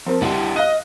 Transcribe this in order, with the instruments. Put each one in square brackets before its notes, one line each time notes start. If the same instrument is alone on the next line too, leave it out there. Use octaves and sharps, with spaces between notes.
[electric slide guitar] F3 [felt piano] C4 A#4 C5
[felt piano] C2 G3 [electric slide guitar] D4 E4 F#5
[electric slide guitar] D#5 [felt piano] F5 F#6